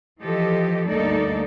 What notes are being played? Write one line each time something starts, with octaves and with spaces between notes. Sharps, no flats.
E3 F3 G4 A4 D#5
D2 G2 A#3 D#4 A4 D5